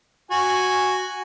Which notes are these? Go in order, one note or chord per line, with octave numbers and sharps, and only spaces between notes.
F#4 G#5